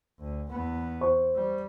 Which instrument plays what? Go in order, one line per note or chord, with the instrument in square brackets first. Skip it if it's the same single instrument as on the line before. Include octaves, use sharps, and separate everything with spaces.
[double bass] D2
E2 B3
[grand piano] C5 C#6
[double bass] G3